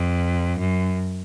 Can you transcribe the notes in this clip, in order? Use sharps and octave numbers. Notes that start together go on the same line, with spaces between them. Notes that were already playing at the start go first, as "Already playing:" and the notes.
Already playing: F2
F#2